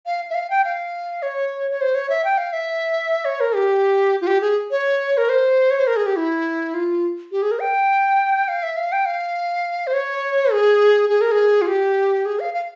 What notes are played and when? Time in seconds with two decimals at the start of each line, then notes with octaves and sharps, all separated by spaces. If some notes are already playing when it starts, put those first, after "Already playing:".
0.06 F5
0.30 E5
0.34 F5
0.50 G5
0.64 F5
1.22 C#5
1.71 C#5
1.81 C5
1.95 C#5
2.10 E5
2.24 G5
2.38 F5
2.53 E5
3.25 C#5
3.40 A#4
3.55 G4
4.21 F4
4.27 G4
4.41 G#4
4.71 C#5
5.17 A#4
5.29 C5
5.71 C#5
5.79 C5
5.87 A#4
5.96 G#4
6.06 G4
6.16 E4
6.74 F4
7.32 G4
7.42 G#4
7.51 A#4
7.61 G5
8.48 F5
8.63 E5
8.77 F5
8.92 G5
9.06 F5
9.87 C5
9.93 C#5
10.52 G#4
11.10 G#4
11.21 A#4
11.32 G#4
11.62 F4
11.67 G4
12.25 G#4
12.40 F5
12.54 F5